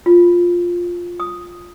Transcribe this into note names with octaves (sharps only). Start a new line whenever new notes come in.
F4
D#6